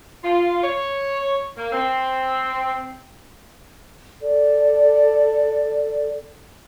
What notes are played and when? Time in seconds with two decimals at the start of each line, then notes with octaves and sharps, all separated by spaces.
0.24 F4
0.63 C#5
1.57 A#3
1.73 C4
4.22 A4 D5